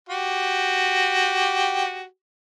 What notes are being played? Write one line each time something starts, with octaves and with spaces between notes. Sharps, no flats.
F#4 G4